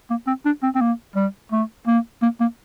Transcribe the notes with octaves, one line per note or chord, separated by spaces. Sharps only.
A#3
C4
D4
C4
C4
A#3
G3
A3
A#3
A#3
A#3